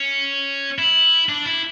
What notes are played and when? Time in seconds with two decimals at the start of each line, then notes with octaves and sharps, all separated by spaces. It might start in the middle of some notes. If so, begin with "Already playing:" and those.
Already playing: C#4
0.78 E4
1.29 D4
1.46 E4